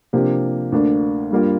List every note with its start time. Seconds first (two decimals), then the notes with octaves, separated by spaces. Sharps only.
0.13 C3 F3 A#3 D4 G4
0.72 D2 D3 A#3 D4
1.31 G2 G3 A#3 F4